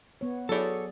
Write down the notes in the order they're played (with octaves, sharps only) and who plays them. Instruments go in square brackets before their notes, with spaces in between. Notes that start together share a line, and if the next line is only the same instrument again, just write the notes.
[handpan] B3 C#5
[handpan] F#3 G#4 D5 [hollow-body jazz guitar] A4 C#5